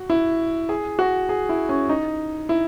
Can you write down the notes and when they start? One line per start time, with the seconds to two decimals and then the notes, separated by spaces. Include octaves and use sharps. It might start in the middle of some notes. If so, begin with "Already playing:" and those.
Already playing: F#4
0.10 E4
0.69 G#4
0.99 F#4
1.29 G#4
1.49 E4
1.69 C#4
1.89 D#4
2.49 E4